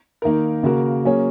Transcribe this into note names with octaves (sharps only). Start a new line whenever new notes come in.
D#3 A#3 D#4 A#4
C#3 A#3 F#4 A#4
F#3 A#3 C#4 G#4 C#5